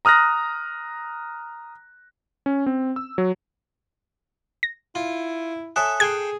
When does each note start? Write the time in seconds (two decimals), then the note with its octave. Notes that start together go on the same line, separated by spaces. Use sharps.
0.05 A#5 D#6 F6 F#6 A#6
2.46 C#4
2.66 C4
2.96 E6
3.18 F#3
4.63 A#6
4.95 E4 F4
5.76 A4 C#5 E5 G#5 D#6 F#6
6.00 G#4 A4 G5 C6 G#6